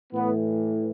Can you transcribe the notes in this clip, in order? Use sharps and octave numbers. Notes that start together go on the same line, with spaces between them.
A2 E3 B3